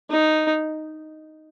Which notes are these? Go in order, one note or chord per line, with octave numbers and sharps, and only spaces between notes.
D#4